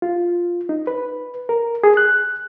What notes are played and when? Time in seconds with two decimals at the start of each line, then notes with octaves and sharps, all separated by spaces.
0.02 F4
0.69 D#4
0.87 B4
1.49 A#4
1.84 G#4
1.97 F#6